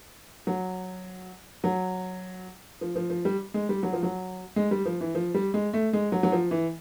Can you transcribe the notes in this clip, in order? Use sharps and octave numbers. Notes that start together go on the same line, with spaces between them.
F#3
F#3
F3
F3
F3
G3
G#3
G3
F#3
F3
F#3
G#3
G3
F3
E3
F3
G3
G#3
A3
G#3
F#3
F#3
F3
E3